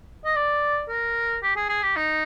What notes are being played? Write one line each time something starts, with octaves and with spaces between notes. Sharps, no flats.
D#5
D5
A#4
G4
G#4
G#4
G4
D#4